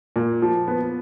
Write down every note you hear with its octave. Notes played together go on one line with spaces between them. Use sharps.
A#2
F3
B3